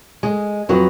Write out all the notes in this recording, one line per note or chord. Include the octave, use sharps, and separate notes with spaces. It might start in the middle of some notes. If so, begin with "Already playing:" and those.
G#3
F2 F#3 B4